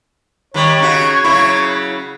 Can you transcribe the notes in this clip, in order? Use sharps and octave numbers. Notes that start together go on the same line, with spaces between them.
D#3 G3 C#5
C#3 D#4 F#4
C#3 F#3 E4